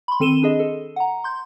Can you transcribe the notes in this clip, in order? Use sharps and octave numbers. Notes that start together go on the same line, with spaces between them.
B5 C6
D#3 C4 A4 D#7 E7 G7
D4 G#4 D#5
A4
F#5 A#5
C6 G6